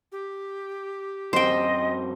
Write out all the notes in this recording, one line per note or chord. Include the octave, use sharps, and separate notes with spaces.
G4
F#2 C4 C5 D#5 G5